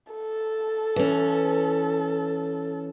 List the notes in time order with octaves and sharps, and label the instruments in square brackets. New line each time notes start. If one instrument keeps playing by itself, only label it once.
[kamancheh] A4
[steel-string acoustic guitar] E3 C#4